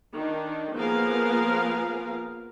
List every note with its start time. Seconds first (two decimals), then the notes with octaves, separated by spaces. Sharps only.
0.14 D#3 D4
0.75 F3 A#3 B3 G#4 A#4 F5